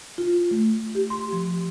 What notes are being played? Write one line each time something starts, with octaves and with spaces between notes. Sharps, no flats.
F4
A3
G4
C6
F3